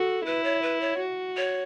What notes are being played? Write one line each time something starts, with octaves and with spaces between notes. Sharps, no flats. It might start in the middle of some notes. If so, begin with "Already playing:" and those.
Already playing: F#4 A4
E4 B4
C#5
B4
C#5
F#4
C#5